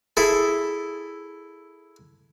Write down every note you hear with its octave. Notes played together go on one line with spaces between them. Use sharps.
E4 G#4 A4